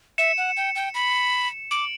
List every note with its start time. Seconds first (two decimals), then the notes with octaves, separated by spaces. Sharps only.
0.18 E5 C#7 E7
0.38 F#5
0.57 G5
0.75 G5
0.94 B5
1.71 D6 D7 F#7